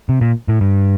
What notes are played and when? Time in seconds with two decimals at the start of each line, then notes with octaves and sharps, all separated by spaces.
0.09 C3
0.21 A#2
0.48 A2
0.61 G2